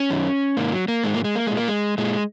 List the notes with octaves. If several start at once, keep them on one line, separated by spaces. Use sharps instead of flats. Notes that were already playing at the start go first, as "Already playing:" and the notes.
Already playing: C#4
F#2 D#3
G#2 D#3 A#3
F#3
A#3
G#2 D#3 G#3
A#3
G#3
A#3
A#2 G#3
A#3
G#3
A#2 G#3